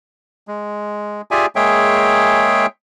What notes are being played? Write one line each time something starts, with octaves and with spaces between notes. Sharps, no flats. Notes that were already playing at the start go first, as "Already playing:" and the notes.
G#3
F4 G4 G#4 D5 E5 G#5
G#3 A#3 G#4 C#5 E5 G5